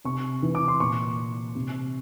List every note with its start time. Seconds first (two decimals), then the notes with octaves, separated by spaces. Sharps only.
0.05 C3 C#6
0.42 E3
0.55 D6
0.68 C6
0.80 A#2 C#6
1.55 C3